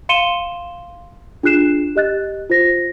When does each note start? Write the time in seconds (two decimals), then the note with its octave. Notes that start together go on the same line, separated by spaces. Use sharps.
0.09 F5 C6 C#7 D#7 E7 G7
1.43 D4 F4 G#4 F#6 C7 E7
1.96 G4 D#5 F#6 A6
2.50 F4 C5 A#6